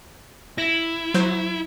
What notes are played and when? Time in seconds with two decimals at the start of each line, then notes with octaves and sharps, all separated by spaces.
0.58 E4 A#6
1.14 F#3 C5 G6